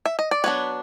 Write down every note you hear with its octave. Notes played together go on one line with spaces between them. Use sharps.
E5
D#5
D5
F#3 B3 D4 B4 C#5